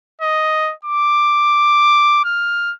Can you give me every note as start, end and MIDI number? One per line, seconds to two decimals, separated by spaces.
0.22 0.73 75
0.85 2.24 86
2.25 2.72 89